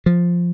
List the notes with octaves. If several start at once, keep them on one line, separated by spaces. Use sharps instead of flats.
F3